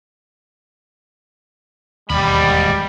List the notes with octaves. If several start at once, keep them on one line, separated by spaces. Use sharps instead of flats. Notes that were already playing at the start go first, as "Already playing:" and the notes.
E1 D#2 G#2 G3 B5